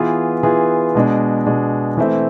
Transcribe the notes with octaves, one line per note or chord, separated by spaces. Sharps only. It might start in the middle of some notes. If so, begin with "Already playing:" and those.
Already playing: E3 B3 F4 G#4
E3 B3 F4 G#4
B2 G#3 D4
B2 G#3 D4
E3 A3 C4 E4